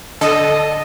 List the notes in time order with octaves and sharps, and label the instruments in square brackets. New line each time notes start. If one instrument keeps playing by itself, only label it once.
[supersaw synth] D3 A4 [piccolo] D#5